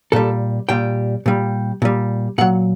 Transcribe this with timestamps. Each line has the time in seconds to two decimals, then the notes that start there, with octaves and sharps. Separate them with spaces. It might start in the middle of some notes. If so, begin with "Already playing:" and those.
0.12 A#2 G3 A4
0.69 A#2 G3 G5
1.26 A#2 G3
1.82 A#2 G3
2.38 A#2 F#3 F#5